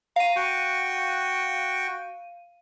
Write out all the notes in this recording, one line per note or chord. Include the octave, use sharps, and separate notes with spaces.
F5 A#5 D#7
F#4 G5 C#6